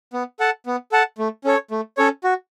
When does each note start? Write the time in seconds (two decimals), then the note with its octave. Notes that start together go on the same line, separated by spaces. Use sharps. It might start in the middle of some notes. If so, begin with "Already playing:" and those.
0.13 B3
0.40 A4 F#5 A5
0.66 B3
0.92 A4 F#5 A5
1.18 A3
1.44 C#4 A4 C#5
1.71 A3
1.97 C#4 A4 C#5
2.24 F#4